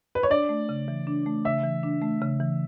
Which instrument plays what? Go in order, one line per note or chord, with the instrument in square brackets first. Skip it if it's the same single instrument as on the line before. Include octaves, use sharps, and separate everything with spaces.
[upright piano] B4
C#5
[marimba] D4 [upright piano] D5
[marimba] A3
C#3
E3
D4
A3
[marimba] C#3 [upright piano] E5
[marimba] E3
D4
A3
C#3
E3